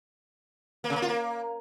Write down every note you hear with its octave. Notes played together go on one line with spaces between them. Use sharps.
A#3
C#3
A#3
F4
A#3